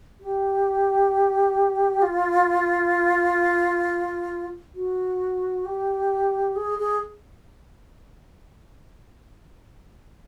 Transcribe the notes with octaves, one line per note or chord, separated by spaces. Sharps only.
G4
F4
F#4
G4
G#4
G#4